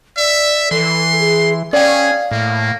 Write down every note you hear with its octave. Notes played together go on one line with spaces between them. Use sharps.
D5 E5
E3 A4 C6
G#4
C#4 G#4 D5 F5 G5
A2 A#3